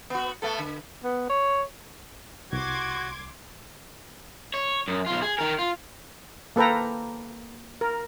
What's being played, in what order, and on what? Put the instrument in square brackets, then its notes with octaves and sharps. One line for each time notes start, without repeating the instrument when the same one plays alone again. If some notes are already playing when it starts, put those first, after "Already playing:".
[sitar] B3 F#4
A3 B3 A4
D3
[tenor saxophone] B3
C#5
[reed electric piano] C2 [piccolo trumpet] F#4 [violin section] C6 D6 G#6
[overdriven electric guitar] C#5
F#2
B1 F4
G#4
D#3 A#4
F4
[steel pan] A#3 A4 B4 G5 A#5
A#4